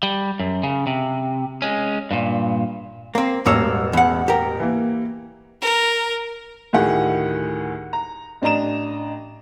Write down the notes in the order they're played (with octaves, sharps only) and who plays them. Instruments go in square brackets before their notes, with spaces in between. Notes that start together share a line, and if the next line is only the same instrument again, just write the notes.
[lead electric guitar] G3
F#2
C#3
C3
G#3 C#4
G2 A#2
[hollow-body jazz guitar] A#3 C4
[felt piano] E1 A1 E6 [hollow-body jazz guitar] G2 A#3 C#5
[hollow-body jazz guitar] E2 F#5
G4 A#4
[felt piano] E3 A#3
[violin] A#4
[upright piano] D2 A2 D#3 G4 G#4 F#5
A#5
A1 D4 D#5 A#5 E7